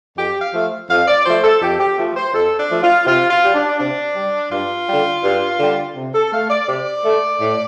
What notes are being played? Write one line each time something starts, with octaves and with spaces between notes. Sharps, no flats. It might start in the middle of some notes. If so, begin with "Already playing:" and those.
F2 G4
F5
F3 A3
F2 F5
D5
F3 A3 C5
A4
F2 G4
G4
F3 A3
C5
F2 A4
D4
F3 A3
F4
C3 F4
F4
G3
D4
C3 D4
G3
G2 F4
D3 G3
G2
D3 G3
C3
A4
A3 F5
D5
C3 D5
A3
A2